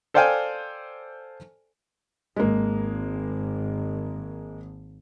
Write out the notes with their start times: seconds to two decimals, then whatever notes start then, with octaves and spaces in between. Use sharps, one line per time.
0.14 A4 C5 D5 F5 G5 G#5
2.36 G#1 G#3 A#3